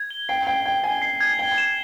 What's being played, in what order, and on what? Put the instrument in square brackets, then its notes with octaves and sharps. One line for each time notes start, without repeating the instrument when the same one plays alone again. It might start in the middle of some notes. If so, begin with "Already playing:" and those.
Already playing: [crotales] G#6
G7
[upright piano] G5 [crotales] C7
[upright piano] G5 [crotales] G#6
[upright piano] G5 [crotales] G#6
[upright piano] G#5 [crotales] G7
[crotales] C7
G#6
[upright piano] G5 [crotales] G7
[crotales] E7